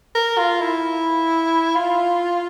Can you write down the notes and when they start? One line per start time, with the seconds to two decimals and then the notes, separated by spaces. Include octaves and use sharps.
0.15 A#4
0.38 F4
0.61 E4
1.75 F4